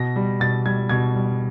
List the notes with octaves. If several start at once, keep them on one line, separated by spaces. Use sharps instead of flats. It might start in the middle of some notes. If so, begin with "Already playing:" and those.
Already playing: B2 A#6
G3
B2 A6
G3 G#6
B2 G#6
G3